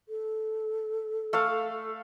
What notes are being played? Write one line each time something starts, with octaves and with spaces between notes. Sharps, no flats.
A4
A3 F5